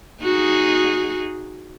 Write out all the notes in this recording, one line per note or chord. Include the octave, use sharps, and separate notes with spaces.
D#4 F#4 G#4